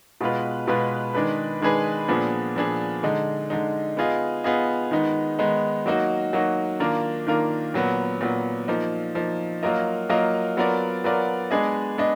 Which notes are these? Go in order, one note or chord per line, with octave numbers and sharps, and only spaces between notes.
B2 G#3 B3 F4 B4
B2 G#3 B3 F4 B4
D#3 G#3 D4 G#4 B4
D#3 G#3 D4 G#4 B4
A#2 F3 B3 D4 G#4
A#2 F3 B3 D4 G#4
D3 G#3 D#4
D3 G#3 D#4
B3 F4 G#4 D#5
B3 F4 G#4 D#5
D#3 G#3 B3 D#4
D#3 G#3 B3 D#4
F#3 A#3 D#4 F#4
F#3 A#3 D#4 F#4
D#3 A#3 D4 F4 A#4
D#3 A#3 D4 F4 A#4
A#2 F#3 B3
A#2 F#3 B3
F3 A#3 D#4
F3 A#3 D#4
F#3 A#3 F4 A#4 D#5
F#3 A#3 F4 A#4 D#5
F#3 B3 F4 A#4 D5
F#3 B3 F4 A#4 D5
G#3 B3 D4 G#4 D#5
G#3 B3 D4 G#4 D#5